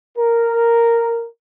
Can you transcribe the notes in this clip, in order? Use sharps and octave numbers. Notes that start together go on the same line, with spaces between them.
A#4